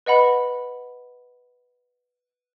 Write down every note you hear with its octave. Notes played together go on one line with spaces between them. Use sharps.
B4 D#5 F#5 B5